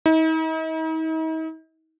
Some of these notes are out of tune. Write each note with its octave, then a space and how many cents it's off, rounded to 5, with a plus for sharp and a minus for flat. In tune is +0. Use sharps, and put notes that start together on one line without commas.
D#4 +45